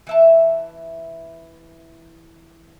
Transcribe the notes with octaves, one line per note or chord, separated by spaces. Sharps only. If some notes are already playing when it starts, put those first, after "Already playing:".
E3 E5 A5